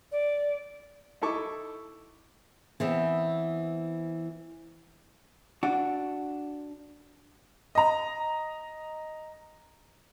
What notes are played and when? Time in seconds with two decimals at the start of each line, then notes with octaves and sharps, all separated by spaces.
0.12 D5
1.22 D#4 E4 A4 C#6 D6
2.80 E3 B3 C4
5.63 D4 F#4
7.75 D#5 A#5